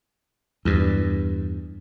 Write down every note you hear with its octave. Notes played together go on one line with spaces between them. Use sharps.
E2 G2